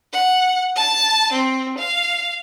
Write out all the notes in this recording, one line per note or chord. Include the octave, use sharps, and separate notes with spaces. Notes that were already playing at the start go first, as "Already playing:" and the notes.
F#5
A5
C4
F5